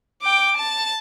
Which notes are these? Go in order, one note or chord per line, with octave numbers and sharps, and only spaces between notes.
G5 D6
A5